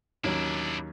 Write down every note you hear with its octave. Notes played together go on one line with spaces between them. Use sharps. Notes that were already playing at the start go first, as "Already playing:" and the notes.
D#2 F#3 C#4 D4 E4